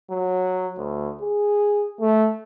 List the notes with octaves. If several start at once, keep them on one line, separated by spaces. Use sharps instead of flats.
F#3
D2
G#4
A3